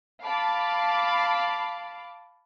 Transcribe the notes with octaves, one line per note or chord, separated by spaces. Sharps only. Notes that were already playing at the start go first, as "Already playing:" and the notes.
F5 A5 B5 D6